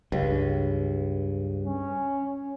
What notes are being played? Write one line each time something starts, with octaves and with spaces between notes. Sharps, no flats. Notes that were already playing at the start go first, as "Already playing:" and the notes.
C#2 G2
C#4